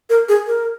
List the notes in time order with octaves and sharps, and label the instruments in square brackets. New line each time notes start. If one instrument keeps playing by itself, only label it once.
[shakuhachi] A#4
G#4
A#4